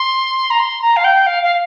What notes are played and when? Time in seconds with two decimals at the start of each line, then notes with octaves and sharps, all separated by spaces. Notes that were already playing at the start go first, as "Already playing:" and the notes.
Already playing: C6
0.51 A#5
0.59 C6
0.82 A#5
0.97 F5
1.04 G5
1.26 F5
1.43 F5